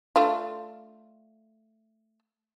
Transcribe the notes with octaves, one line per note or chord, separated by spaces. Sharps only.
A3 D4 F4